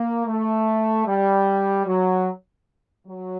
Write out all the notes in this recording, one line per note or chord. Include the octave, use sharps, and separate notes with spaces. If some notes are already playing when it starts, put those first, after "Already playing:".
Already playing: A#3
A3
G3
F#3
F#3